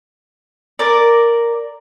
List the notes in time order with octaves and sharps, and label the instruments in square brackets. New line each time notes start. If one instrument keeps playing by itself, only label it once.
[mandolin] A#4 D5